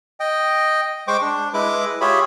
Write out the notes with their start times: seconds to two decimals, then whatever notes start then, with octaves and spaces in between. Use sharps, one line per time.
0.20 D#5 G5
1.08 G#3 C5 G5 C#6 D6
1.22 D4
1.54 G#3 E4 B4 D6
2.01 F4 G4 G#4 C#5 E5 B5